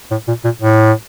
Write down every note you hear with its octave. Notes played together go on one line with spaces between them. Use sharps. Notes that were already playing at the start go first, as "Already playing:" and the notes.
A2
A#2
A#2
A2